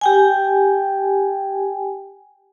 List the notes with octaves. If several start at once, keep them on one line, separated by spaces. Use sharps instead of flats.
G4 G5 G#5